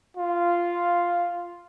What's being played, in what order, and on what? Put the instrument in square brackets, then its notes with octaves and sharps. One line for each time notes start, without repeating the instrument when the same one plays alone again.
[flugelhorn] F4